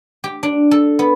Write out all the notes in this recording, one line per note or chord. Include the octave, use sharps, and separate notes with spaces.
G4
D4
A4
B3